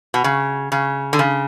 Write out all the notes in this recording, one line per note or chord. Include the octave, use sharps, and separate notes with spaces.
B2
C#3
C#3
D3
C#3